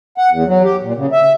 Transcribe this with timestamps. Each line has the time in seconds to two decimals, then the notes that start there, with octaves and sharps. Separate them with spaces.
0.18 F#5
0.31 E2
0.46 F#3
0.63 G4
0.83 A#2
0.97 C#3
1.12 E5